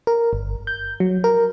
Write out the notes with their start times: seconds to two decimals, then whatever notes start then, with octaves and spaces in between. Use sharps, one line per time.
0.07 A#4
0.33 G1
0.67 G6
1.00 F#3
1.24 A#4